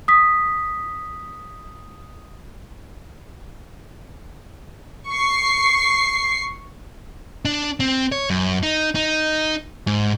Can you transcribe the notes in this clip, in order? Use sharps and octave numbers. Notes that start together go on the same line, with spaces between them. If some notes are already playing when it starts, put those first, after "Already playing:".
D#6 B6
C#6 C7
D4
C4
C#5
F#2
D#4
D#4
G#2